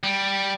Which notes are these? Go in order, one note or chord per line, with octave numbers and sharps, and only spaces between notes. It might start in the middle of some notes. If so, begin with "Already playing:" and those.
G3